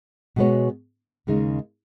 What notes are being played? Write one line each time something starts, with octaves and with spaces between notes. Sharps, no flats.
B2 G#3 B3 F#4 C#5
D#2 C#3 G#3 D#4